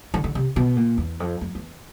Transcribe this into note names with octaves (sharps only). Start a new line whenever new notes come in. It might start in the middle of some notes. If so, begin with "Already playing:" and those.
D3
D3
C3
B2
A#2
E2
F2
F2
E2